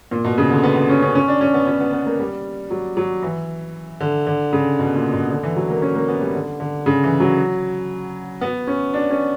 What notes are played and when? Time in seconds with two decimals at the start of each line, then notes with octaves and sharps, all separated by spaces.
0.11 A#2
0.25 B2
0.38 C#3
0.51 D3
0.63 B3
0.76 B3
0.90 C#4
1.02 C#4
1.15 C#4
1.28 D4
1.41 C#4
1.54 B3
1.67 C#4
1.80 B3
1.93 B3
2.06 A#3
2.19 G3
2.70 F#3
2.97 F#3
3.23 E3
4.00 D3
4.27 D3
4.53 C#3
4.79 B2
4.96 A#2
5.13 B2
5.30 D3
5.43 E3
5.56 F#3
5.70 A#3
5.82 C#4
5.95 A#3
6.08 B3
6.21 G3
6.35 D3
6.60 D3
6.86 C#3
7.03 E3
7.20 F#3
8.41 B3
8.67 C#4
8.94 D4
9.11 C#4